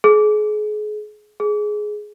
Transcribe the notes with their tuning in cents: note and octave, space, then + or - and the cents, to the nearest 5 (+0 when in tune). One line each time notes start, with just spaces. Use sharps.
G#4 +35
G#4 +15